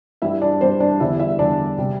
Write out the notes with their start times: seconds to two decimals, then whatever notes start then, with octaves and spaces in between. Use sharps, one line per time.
0.22 G2 G3 E4 E5
0.42 D4 D5
0.61 G2 G3 C4 C5
0.80 D4 D5
1.00 E2 D3 G3 E4 E5
1.19 E4 E5
1.39 E2 D3 G3 D4 D5
1.78 C3 G3